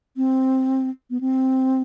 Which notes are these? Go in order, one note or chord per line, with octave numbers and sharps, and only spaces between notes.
C4
B3
C4